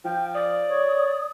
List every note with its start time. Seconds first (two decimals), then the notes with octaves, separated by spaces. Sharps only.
0.05 F3 G5
0.34 D5 D#6
0.66 C#5